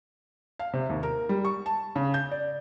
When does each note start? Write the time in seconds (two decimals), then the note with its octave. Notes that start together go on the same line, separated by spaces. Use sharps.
0.59 F5
0.73 C3
0.90 D#2
1.03 A#4
1.29 G3
1.45 C#6
1.66 A5
1.96 C#3
2.14 G6
2.31 D5